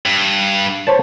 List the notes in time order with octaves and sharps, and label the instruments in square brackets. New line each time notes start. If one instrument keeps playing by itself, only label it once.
[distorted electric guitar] G2
[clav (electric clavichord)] C5 C#5 A5